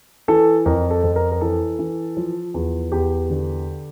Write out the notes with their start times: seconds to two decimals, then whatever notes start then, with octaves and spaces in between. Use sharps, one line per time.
0.28 E3 A4
0.66 F2 A#4
0.91 A4
1.03 F2
1.16 A#4
1.32 A#4
1.41 E3 A4
1.79 E3
2.17 F3
2.54 E2
2.92 E2 G4
3.30 D3